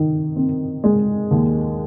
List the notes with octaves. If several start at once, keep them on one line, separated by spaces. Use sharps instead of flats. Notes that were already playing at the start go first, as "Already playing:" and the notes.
Already playing: D#3 D#4
C4
G#3
D#2